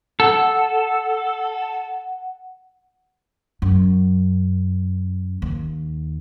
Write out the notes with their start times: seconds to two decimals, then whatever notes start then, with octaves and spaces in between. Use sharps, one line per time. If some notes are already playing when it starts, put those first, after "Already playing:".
0.20 A4 F#5
3.62 F#2
5.42 D#2